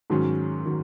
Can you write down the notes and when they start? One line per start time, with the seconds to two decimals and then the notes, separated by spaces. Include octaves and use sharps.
0.10 G#2 D#3 F#3 C#4
0.66 D#3 F#3